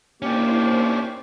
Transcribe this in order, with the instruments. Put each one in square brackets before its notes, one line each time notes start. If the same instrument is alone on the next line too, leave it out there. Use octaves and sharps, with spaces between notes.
[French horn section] A#3 [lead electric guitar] C#4 D4 [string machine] E4 C5 [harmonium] G4